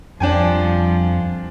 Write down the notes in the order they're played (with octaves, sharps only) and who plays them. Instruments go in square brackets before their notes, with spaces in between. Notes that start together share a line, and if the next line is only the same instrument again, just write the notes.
[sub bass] F2 [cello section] F3 G3 F4 [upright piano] D4 G5 G#5